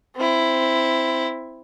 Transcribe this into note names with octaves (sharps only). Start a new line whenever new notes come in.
C4 E4